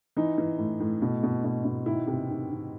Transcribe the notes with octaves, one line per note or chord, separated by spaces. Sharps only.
E3 D#4
E3
A2
A2
B2
B2
B2
B2
D#3 E4
C3
D#3
D#3